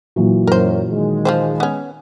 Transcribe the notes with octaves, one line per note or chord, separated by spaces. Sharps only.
A#2 E3 F#3
F#2 A#4 C5
D#3 G#3
F3 G#4 C5
B3 C#4